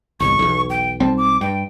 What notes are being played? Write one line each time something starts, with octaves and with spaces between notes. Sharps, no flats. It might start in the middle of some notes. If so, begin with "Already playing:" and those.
G1 C2 C#6
B1 E2
G5
B1 G3 C4 A5
D6
G2 G5